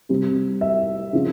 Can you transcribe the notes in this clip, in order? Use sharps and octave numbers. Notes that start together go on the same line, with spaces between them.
C3 G3 C4
E5
C#3 F3 C4